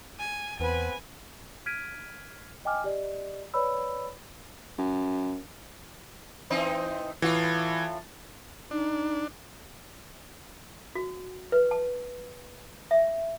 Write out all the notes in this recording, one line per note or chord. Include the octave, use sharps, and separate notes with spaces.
G#5
E2 B3 C4 B4 G#5
F6 G#6 B6 D7 D#7
D#5 G5 G#5 D6 F6
G4 D5 D#5
B4 C#5 D5 B5 E6
F#2
E3 C4 D#4
A2 E3 F4
D4 D#4
F#4
B4
A5
E5